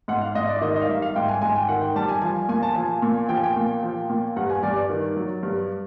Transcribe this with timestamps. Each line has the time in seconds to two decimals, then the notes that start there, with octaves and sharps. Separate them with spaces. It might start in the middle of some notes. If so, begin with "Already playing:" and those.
0.08 G#2 F#5
0.21 F5
0.35 G#2 D#5
0.48 D5
0.57 E5
0.61 D#3 D#5
0.76 D#5
0.82 F5
0.89 G3 E5
1.02 F5
1.16 G#2 G5
1.28 G#5
1.42 G#2 G#5
1.55 G5
1.69 D#3 F#5
1.82 G5
1.96 G3 A5
2.09 G#5
2.22 F3 G#5
2.49 A#2 G#5
2.63 A5
2.75 F3 G#5
3.02 A#2
3.29 F3 G5
3.37 G#5
3.43 G5
3.56 A#2
3.83 F3
4.09 A#2
4.36 G2 F#5
4.50 G#5
4.63 G2 D5
4.76 D5
4.90 D#3
5.17 F#3
5.43 G2